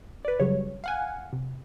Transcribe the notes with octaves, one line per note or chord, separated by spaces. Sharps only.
B4 D5
F#2 C#3 F#3 G3 C#5
F5 F#5 G#5
C3